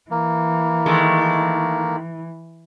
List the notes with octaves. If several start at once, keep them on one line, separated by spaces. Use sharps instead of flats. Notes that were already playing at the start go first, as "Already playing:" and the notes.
E3 A#3
D#3 G#3 A3